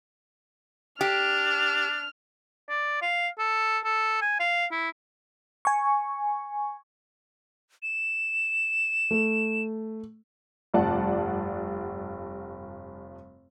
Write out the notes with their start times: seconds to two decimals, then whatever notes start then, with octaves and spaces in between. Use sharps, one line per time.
1.01 D4 G4 F6
2.69 D5
3.02 F5
3.39 A4
3.84 A4
4.22 G#5
4.40 F5
4.71 E4
5.65 G#5 C#6
7.83 E7
9.11 A3
10.74 F1 G2 F4 D5 F#5 A5